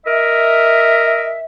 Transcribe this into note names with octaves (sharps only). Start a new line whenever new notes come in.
A#4 D#5 E5